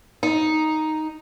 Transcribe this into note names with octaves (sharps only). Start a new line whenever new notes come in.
D#4